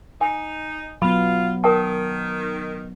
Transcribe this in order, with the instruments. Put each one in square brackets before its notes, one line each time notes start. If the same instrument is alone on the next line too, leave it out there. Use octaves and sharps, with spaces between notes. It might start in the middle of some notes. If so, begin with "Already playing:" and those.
[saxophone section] D#4 [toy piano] G#5
[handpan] F#3 B3 [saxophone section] F4 [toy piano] B5
[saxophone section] D#3 [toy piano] A#4 G5 A5